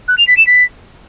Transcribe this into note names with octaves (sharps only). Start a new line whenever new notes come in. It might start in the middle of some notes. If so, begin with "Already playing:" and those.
F#6
F7
B6
E7
B6